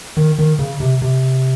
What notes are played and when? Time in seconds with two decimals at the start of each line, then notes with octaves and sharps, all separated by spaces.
0.17 D#3
0.39 D#3
0.59 C#3
0.80 C3
1.02 C3